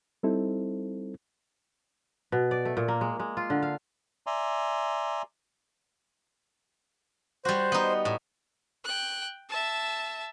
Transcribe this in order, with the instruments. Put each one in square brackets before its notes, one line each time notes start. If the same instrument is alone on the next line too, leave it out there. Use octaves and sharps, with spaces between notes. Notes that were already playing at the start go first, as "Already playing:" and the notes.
[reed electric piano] G3 C4 D#4 E4 A4 C5
[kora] B2
D5
A3
A#2
A#3
G#3
G#3
F4
D3
F5
[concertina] D5 E5 G#5 A#5 C6
[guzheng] G3 F#4 [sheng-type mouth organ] C5
[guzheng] B3 D#4
A2
[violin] G5 F#6
E5 A5